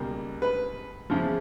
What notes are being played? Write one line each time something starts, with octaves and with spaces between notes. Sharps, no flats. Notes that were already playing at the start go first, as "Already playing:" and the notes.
Already playing: C#2 B2 G3 A#3
B4
E2 C#3 F3